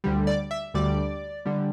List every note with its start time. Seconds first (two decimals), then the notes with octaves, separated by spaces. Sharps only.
0.04 D2 D3 G3
0.27 D5
0.51 E5
0.74 D2 D3 G3 D5
1.45 D3 G3